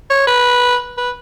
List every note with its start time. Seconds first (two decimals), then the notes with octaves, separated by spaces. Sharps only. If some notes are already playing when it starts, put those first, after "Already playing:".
0.11 C#5
0.27 B4
0.98 B4